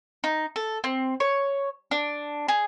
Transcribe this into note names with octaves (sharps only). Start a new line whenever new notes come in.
D#4
A4
C4
C#5
D4
G#4